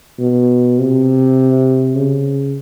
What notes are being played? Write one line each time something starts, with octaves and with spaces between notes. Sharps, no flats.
B2
C3
C#3